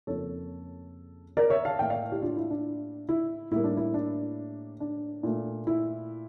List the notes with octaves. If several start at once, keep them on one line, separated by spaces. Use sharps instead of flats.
F2 C#3 F3 A#3 A4 C#5
A#4 D5
C#5 E5
F5 A5
A2 E3 A#3 E5 G5
D5 F5
E4 G4
D4 F4
E4
D4
E4
A2 G3 A#3 E4
D4
E4
D4
D4
A#2 A3
E4